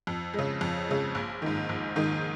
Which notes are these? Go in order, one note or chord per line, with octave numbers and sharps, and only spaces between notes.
F2
C#3 G#3
F2
C#3 G#3
A#1
G#2 D#3
A#1
G#2 D#3